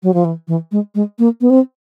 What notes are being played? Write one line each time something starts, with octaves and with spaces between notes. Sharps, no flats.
F#3
F3
E3
E3
G#3
G#3
A#3
B3
C4